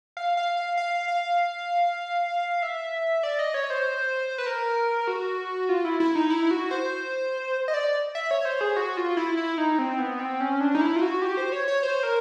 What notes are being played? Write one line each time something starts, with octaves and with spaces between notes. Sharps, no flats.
F5
F5
F5
F5
F5
E5
D5
D#5
C#5
C5
B4
A#4
F#4
F4
E4
E4
D#4
E4
F#4
C5
D#5
D5
E5
C#5
C5
G#4
F#4
F4
E4
E4
D#4
C4
B3
C4
C#4
D4
D#4
E4
F4
F#4
G4
C5
C#5
C#5
C5
A#4